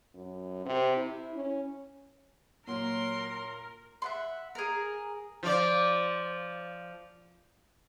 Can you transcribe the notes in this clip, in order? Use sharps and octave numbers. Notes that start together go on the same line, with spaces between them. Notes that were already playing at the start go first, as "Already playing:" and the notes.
F#2
C3
E4
C#4
A#2 F#3 A#4 C6
E5 F#5 C6
G#4 A#4
F3 D5